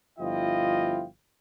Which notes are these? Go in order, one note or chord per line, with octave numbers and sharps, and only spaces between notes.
G1 F3 E4 F4 D#5 G5